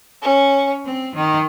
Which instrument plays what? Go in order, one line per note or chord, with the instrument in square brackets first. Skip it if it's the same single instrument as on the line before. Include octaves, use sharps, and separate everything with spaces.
[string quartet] C#4
C4
D#3